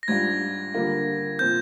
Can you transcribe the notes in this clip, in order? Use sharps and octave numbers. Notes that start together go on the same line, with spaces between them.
A#6
G#2 G3 D4 F4 G#6
D3 G3 A#3 F4
A#2 F3 C4 G6